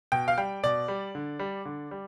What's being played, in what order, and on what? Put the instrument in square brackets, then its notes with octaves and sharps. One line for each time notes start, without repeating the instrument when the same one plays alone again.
[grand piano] B2 G5
F5
G3 G5
B2 D5
G3
D3
G3
D3
G3